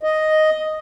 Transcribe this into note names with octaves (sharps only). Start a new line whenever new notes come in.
D#5